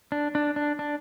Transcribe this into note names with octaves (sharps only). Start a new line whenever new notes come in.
D4
D4
D4
D4